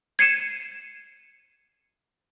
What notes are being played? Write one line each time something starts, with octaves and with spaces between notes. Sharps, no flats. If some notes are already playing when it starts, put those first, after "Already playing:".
G#6 C7 C#7 D#7 E7